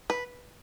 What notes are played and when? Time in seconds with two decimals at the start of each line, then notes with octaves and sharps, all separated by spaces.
0.10 B4